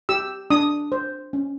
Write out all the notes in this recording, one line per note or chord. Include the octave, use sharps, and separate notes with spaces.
G4 E6
D4 D#6
C5
C#4